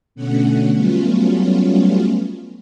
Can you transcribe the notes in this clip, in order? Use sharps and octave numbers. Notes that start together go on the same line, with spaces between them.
B2 D3 A3 C#4 F#5
F#3 G3 A3 B3 C#4 F4